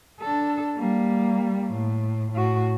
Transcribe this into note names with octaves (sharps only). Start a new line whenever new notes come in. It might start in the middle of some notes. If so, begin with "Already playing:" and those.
D4 A4
G3 A#3
A2
A2 F#4